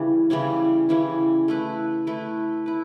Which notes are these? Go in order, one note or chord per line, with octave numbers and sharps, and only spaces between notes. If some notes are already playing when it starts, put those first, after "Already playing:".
Already playing: C#3 E3 G3 C#4
C#3 E3 G3 C#4
C#3 E3 G3 C#4
A3 E4 B4
A3 E4 B4
E4 B4